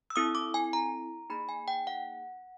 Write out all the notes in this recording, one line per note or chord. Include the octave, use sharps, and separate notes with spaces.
E6
C4 E4 A4 D#6
D6
G#5
A#5
A#3 D#4 G#4 B5
G#5
G5
F#5